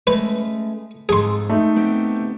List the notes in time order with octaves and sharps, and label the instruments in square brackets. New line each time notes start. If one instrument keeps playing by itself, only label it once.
[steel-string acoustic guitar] G#3 A3 C#4 [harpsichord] B4
[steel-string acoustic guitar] F2 G#2 A4 [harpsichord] G#4 C6
[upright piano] A3 D#4
[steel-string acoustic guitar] B3 C4 G4